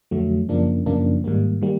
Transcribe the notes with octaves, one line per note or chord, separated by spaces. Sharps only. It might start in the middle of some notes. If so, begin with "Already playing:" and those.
F2 D3 F#3 A3
F#2 C#3 F3 A#3 D4
F#2 C#3 F3 A#3 D4
G#2 D#3 G3 A#3
D#3 G3 A#3